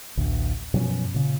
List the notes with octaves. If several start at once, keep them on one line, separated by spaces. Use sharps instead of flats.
A1 D2
F#2 B2 F3 C#4
A#2 C#3